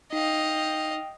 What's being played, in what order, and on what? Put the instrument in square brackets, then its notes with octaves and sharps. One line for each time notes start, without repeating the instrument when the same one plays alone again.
[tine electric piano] D#4 [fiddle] D#5 F5 [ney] G5